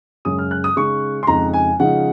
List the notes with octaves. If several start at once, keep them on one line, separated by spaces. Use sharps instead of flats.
F#2 C#3 G#3 C#4 D#6
F6
F#6
D#6
C#3 G#3 D#4 C#6
C6
F2 C#3 G#3 D#4 A#5
G#5
C#3 F3 G#3 D#4 F#5